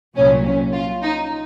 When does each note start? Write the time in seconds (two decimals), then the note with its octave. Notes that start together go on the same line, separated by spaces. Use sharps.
0.15 C2 A#2 F#3 C#4
0.45 C#4
0.73 F4
1.02 D#4